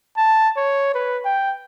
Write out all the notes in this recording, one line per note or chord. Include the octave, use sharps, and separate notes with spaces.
A5
C#5
B4
G5